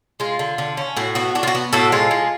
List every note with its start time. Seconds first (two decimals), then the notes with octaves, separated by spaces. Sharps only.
0.20 G#3 F4
0.39 D3
0.58 D3
0.77 C#4
0.97 A2 F#4
1.15 B3 F#4
1.35 D4 F#4
1.43 F4
1.48 F#4
1.55 B3
1.73 A2 F#4 A4
1.92 G#3 F4
2.11 G#3